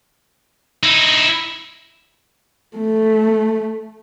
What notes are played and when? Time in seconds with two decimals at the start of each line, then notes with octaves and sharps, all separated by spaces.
0.83 D#4 E4
2.77 A3